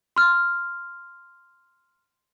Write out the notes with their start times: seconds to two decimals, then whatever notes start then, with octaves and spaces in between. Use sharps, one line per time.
0.16 C6 F6